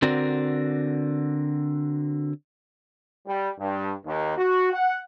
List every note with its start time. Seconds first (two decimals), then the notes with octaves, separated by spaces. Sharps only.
0.02 D3 C4 F#4 A#4 D5
3.27 G3
3.59 G2
4.06 D#2
4.37 F#4
4.72 F#5